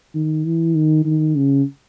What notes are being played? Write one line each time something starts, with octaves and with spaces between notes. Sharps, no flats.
D#3
E3
D#3
D#3
C#3